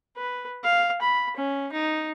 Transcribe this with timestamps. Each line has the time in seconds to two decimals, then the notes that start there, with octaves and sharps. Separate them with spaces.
0.16 B4
0.64 F5
1.02 B5
1.37 C#4
1.72 D#4